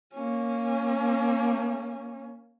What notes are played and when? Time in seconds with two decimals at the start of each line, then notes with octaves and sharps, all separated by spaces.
0.14 A#3 C#4